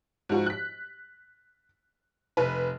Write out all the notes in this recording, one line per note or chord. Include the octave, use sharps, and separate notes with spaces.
G#2 F3 F#4
F#6 B6
F1 B4